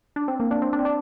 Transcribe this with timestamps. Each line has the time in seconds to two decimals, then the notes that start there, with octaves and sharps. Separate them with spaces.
0.16 D4
0.28 C4
0.40 A#3
0.51 D4
0.62 C4
0.73 D4
0.79 C4
0.85 D4